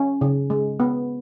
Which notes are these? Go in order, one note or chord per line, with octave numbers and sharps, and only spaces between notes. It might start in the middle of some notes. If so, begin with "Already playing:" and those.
Already playing: C#4
C#3
G#3
B3